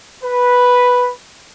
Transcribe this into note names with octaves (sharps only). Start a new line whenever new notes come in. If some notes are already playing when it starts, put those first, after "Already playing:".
B4